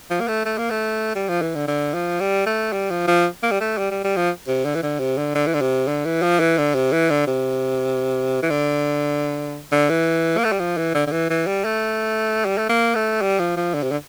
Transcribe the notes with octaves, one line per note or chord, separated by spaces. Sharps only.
F3
A#3
A3
A3
A#3
A3
G3
F3
E3
D3
D3
F3
G3
A3
G3
F3
F3
A#3
G3
A3
G3
G3
G3
F3
C3
D3
E3
D3
C3
D3
D3
E3
D3
C3
D3
E3
F3
E3
D3
C3
E3
D3
C3
E3
D3
D3
E3
A#3
A3
G3
F3
E3
D3
D3
E3
E3
G3
A3
G3
A3
A#3
A3
G3
F3
F3
D3
C3
D3